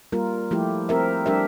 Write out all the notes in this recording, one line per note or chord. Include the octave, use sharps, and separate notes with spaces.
G3 A#3 F4 A#4
F3 A3 E4 G4
C4 G4 A#4 E5
G3 D4 G4 A#4 E5